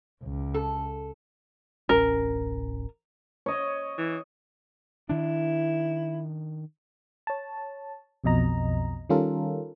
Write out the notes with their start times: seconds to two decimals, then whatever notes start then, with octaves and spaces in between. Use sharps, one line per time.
0.23 C#2
0.54 A4
1.89 D1 A1 C#4 A#4
3.46 C#5 D#5
3.98 E3
5.09 D#3 D4 E4
7.27 C#5 A5
8.24 B1 F2 B2 D#5 A#5
9.10 D#3 G3 C#4 F4 A4 A#4